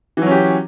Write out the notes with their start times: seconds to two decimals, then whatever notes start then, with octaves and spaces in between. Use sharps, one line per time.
0.17 E3
0.22 F#3
0.27 C#4
0.31 G4